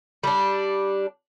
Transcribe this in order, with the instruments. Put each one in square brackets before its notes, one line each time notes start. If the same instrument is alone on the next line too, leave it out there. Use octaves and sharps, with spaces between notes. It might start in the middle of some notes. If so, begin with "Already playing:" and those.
[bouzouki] G3 D4